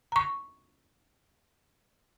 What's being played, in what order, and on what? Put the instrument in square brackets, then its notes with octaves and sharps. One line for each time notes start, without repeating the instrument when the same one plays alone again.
[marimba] A#5 C#6